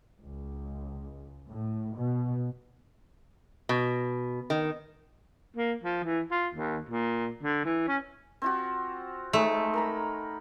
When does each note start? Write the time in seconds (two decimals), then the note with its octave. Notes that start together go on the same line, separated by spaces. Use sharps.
0.24 C#2
1.47 A2
1.96 B2
3.69 B2
4.50 D#3
5.56 A#3
5.84 F3
6.04 E3
6.31 F4
6.54 D#2
6.89 A#2
7.43 D3
7.65 E3
7.88 C#4
8.42 C4 F4 F#4
9.33 G#3 A3 D#4 G#5
9.74 A#4 A#5 B5